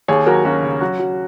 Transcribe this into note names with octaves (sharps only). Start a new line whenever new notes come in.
D#2 G#4 C#5
F#3 F#4 A#4
D#2 C#4 F#4
C#3
F#3 C#4 F#4
F#3